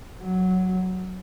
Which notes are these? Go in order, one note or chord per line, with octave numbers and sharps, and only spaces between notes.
F#3